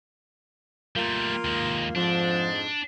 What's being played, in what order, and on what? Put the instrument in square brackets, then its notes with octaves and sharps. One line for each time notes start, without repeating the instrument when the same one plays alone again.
[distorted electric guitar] G3 A3 [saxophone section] A#3 F4
[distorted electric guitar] D#2 G#3
[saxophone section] F2 G#2 [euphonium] F3 [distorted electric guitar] D4